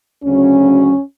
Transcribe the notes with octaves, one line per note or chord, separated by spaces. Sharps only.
D2 C#3 F#3 C#4